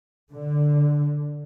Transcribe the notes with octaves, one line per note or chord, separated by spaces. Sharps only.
D3